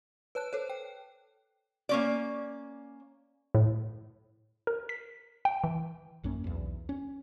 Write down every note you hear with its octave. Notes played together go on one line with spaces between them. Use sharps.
B4 C#5 A5 F#6
A4 C5 C#5
G5
A#3 C#4 D5
A2
A#4
B6
G5
E3
A#1 F#2 A#3 C#4
B1 E2
C#4